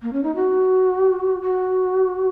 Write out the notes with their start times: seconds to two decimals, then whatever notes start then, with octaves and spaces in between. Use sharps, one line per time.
0.03 A#3
0.13 C#4
0.23 D#4
0.36 F#4
1.42 F#4